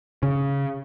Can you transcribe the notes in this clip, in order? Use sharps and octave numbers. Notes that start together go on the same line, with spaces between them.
C#3